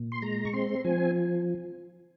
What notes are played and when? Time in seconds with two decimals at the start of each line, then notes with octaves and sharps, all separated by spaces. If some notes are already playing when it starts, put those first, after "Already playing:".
Already playing: A#2
0.12 C6
0.22 G#3 A#5
0.45 C#6
0.53 C4 C6
0.84 F3 G#5